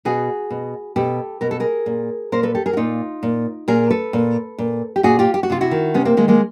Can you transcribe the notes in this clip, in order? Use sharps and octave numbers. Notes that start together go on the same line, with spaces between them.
B2 F#4 G#4
B2
B2 G4 A4
B2 A#4
A4
G#4 A#4
A#2
A#2 A#4 C5
A4 B4
G4 A4
G#4 A#4
F#4
A#2 D#4 F4
A#2
A#2 G#4 A#4
A4 B4
A#2
A#2
G4
A#2 F#4 G#4
F4 G4
G4
F#4
C3 F4
E4 F#4
D#3
C3 B3 C#4
A#3 C4
D#3 G#3 A#3
G#3 A#3